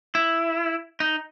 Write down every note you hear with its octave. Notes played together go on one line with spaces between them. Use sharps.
E4
D#4